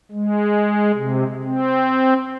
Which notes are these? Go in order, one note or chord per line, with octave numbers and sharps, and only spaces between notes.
G#3
C3
C4